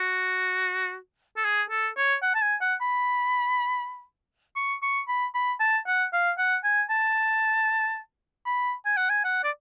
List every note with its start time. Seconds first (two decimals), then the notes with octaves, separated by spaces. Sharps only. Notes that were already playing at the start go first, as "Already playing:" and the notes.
Already playing: F#4
1.37 A4
1.45 G#4
1.70 A4
1.97 C#5
2.22 F#5
2.35 A5
2.42 G#5
2.61 F#5
2.81 B5
4.56 C#6
4.82 C#6
5.08 B5
5.35 B5
5.60 A5
5.87 F#5
6.13 F5
6.38 F#5
6.64 G#5
6.90 A5
8.46 B5
8.86 G#5
8.97 F#5
9.10 G#5
9.24 F#5
9.44 D5